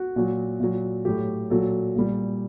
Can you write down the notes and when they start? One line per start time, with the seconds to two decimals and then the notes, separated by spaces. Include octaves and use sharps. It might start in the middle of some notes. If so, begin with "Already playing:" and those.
Already playing: F#4
0.16 A#2 F#3
0.60 A#2 F#3
1.05 A2 F#3 G4
1.50 A#2 F#3 A4
1.95 A#2 G3